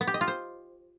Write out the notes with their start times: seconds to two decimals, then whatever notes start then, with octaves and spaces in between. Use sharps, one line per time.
0.01 B3
0.07 G4
0.14 D#5
0.21 F4
0.28 C5